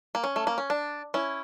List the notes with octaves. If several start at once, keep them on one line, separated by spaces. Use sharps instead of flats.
A#3
C#4
A3
A#3
C#4
D4
C#4 E4